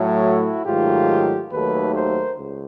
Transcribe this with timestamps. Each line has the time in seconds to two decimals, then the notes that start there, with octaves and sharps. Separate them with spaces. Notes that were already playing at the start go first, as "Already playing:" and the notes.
Already playing: A2 F#3 A3
0.23 E4 F#4
0.66 G#2 D#3 F#3 A3 F4 G4
1.52 D#2 D#3 F#3 A3 A4 B4
1.95 A#4 C5
2.38 C#2